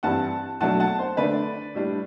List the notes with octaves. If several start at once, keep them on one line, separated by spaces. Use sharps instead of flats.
G2 E3 G3 C4 F#5 A5
B2 F#3 A3 D4 F#5 A5
F#5 A5
C5
D3 A3 D4 B4 D5
A2 G3 D4